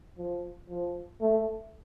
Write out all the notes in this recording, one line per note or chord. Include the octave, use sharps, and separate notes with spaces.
F3
F3
A3